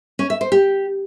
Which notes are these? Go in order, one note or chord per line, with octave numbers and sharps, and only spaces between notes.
C#4
E5
C5
G4